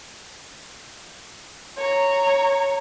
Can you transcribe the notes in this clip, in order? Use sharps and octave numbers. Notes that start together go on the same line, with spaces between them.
C#5 A#5